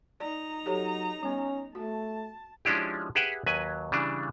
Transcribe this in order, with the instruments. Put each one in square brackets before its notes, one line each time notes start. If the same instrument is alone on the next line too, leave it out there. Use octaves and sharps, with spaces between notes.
[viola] D#4 A#5 [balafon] D5
[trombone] F#3 [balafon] G4 A4 C#5
[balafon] G3 B3 [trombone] C#4
[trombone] A3 [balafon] F#4 [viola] A5
[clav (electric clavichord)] F3 G#3 C#4 D4 E4 G4
G4 G#4 B4 E5 F#5 G5
D#2 F#3 B4 G#5
C#3 E3 G3 D4